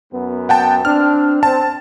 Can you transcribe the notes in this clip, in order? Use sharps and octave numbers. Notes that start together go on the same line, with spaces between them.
F#2 B3
F#5 G5 A5
C4 D4 F6
C4 A5